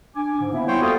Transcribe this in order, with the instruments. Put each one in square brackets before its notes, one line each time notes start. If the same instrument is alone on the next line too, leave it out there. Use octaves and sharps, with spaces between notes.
[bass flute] D4 [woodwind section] G#5 D6
[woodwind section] G#2 [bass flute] D3
[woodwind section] A#3 B3 E4 [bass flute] E5
[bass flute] G3 [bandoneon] C5 C#5 G5
[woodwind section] F2 F#4 D#6 [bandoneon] G3 A#3 F4 [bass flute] A4